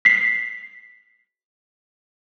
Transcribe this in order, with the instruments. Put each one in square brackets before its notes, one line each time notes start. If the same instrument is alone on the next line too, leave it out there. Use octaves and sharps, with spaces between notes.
[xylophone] B6 C7